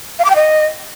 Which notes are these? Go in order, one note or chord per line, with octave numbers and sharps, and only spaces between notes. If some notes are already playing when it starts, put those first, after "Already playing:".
F5
D6
G5
D#5